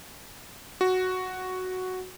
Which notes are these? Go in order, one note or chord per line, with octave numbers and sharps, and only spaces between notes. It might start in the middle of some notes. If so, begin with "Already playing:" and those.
F#4